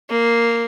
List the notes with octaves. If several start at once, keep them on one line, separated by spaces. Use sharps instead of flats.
A#3